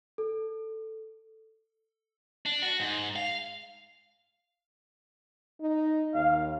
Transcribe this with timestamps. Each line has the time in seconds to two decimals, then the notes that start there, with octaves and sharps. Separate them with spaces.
0.18 A4
2.46 D4
2.62 F#4
2.80 G#2
3.16 F5
5.61 D#4
6.15 D#2 F5